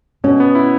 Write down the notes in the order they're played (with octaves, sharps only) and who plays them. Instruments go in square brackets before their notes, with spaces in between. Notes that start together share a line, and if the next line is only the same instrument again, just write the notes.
[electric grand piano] B2 [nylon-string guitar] C#4
[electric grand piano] B3
E4